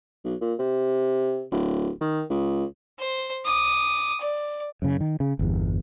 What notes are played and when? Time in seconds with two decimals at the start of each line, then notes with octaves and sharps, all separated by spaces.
0.24 B1
0.41 A#2
0.59 C3
1.52 D1
2.01 D#3
2.30 C#2
2.99 C5
3.45 D6 D#6
4.21 D5
4.82 F#2 C#3
5.01 D#3
5.20 C#3
5.39 G1 E2